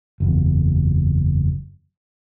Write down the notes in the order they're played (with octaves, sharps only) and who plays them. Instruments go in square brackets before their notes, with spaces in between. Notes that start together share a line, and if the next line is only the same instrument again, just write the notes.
[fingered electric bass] F#1 E2